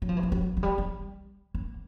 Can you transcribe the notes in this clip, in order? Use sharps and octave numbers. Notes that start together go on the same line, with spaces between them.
F#3
F3
E3
F3
F#3
F#3
G3
G3
A#3